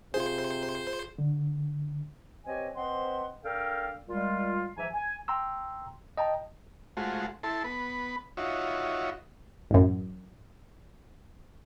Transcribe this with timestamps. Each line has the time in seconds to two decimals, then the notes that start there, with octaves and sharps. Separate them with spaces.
0.14 C3 F4 G#4 C5
1.18 D3
2.46 C4 G4 B4 C#5 D#5 G#5
2.76 C4 B4 C5 D#5 F#5 C6
3.44 D4 A4 A#4 F5 G5
4.08 A#2 G3 G#3 F4
4.78 G#2 E3 F3 E5 G#5 A#5
4.92 G#5
5.28 G5 A#5 C6 E6
6.17 D#5 G5 A5 A#5
6.97 G#3 A3 F4 F#4 C5
7.43 E4 A4 A5 C6
7.64 B3 B4
8.37 D#4 F4 F#4 C#5 E5
9.70 A1 F#2